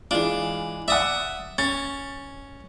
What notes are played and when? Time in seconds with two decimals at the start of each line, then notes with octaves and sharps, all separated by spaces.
0.11 E3 G#3 D4 F4
0.88 D5 E5 F#5 D#6
1.58 C#4 A6